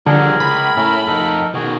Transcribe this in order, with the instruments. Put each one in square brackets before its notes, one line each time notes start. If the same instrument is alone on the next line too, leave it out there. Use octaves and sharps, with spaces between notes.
[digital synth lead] D3 [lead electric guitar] F3 G3 [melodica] G#4 A#4
[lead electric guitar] C#2 [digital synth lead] B5
[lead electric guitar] A2 A4 [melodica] C#4 E4 A#4
[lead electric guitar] F2 D#4 [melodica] A4 A#4
[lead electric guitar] B2 D#3 [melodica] F#4 G#4